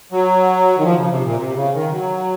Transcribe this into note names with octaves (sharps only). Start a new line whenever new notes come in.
F#3
D#3
F3
C#3
C3
A#2
C3
C#3
D#3
F#3